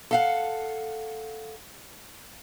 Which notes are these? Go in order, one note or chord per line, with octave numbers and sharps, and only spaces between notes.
A4 F5 F#5